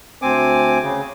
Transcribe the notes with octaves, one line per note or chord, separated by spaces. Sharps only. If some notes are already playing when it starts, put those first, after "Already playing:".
D2 C4 G#5 D6
C#3